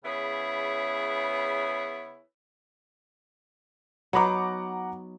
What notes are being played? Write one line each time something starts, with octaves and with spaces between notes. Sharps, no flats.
C#3 B3 E4 G#4 B4 C#5
F#3 B3 D#4 F#5 A#5 D6